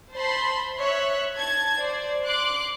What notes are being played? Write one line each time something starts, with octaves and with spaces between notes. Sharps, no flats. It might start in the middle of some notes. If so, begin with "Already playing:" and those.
C5 A5 B5 C6
C#5 E5 F#6
A5 G#6
C5 D5
C6 D6 F#6